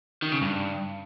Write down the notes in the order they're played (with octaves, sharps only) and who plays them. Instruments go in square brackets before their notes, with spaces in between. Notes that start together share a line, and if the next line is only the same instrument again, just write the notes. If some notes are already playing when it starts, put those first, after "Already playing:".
[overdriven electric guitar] D#3
C#3
G2